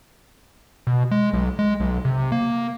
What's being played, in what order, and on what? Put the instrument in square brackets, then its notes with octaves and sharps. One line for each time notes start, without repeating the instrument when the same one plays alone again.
[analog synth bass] B2
G#3
B1
G#3
B1
C3
A#3